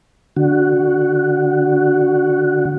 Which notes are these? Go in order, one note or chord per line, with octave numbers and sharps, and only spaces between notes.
D3 F#4